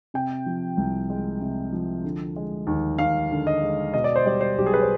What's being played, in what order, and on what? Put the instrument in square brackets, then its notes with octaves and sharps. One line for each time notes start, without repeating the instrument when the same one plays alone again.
[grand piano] C3 G5
F3
C2
G#3
C3
F3
D3
G#3
D#2
D#2 F5
D3
D#5
G#3
B2 D#5
D5
C5
G3 D5
C5
B1 G4
G#4
B4
C5